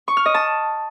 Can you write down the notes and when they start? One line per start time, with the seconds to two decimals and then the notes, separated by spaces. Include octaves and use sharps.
0.08 C#6
0.17 F6
0.26 D#5
0.34 A5